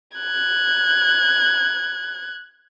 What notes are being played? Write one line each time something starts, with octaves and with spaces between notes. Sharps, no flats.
F#6 G#6